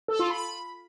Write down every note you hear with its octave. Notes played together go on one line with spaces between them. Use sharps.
A4
F4
B5